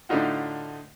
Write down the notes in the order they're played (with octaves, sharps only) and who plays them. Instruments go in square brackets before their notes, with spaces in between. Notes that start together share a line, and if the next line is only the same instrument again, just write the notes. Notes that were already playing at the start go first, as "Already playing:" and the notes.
[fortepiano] A2 D3 A3 D#4 F4 F#4